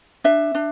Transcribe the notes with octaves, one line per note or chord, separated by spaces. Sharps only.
D4 E5
D4